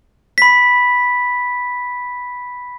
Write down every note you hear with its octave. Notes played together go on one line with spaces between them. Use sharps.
B5 B6